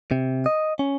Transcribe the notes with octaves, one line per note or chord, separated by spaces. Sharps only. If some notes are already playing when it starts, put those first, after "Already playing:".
C3
D#5
C#4